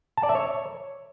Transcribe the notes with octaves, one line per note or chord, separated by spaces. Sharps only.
A5
D5
E5
C#5